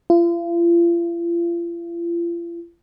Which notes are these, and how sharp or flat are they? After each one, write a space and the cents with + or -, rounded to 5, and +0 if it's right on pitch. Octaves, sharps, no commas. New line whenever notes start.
F4 -40